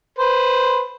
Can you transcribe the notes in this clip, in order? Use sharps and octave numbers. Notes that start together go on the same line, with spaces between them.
B4 C5